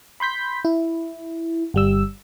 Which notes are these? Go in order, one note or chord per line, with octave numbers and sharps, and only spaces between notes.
B5 C6 G6 B6
E4
G1 G3 E6